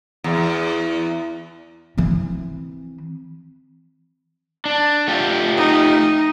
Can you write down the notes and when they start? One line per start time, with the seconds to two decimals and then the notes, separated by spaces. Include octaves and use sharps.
0.24 E2
1.97 E3 C4
4.65 D4
5.08 A3 F4 G4
5.57 D#4